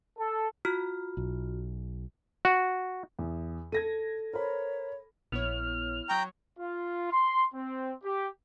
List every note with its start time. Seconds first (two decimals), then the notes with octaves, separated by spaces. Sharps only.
0.18 A4
0.65 F4 F#4 F6
1.17 B1
2.45 F#4
3.19 E2
3.72 A4 G#6 A#6 D#7
4.33 A#4 C5 C#5 B5
5.32 A#1 B3 E4 C#5 F6
6.09 F#3 G5 A#5 C#6
6.59 F4
7.12 C6
7.54 C4
8.04 G4